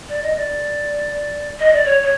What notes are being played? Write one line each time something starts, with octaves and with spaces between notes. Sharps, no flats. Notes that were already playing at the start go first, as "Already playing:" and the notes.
D5
D#5
D5
D#5
D5
C#5
C#5